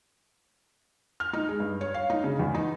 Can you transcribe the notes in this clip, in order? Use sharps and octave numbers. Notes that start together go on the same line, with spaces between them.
F6
D#4
G#3
G2
C#5
F5
D#4
C#3
E2
D#4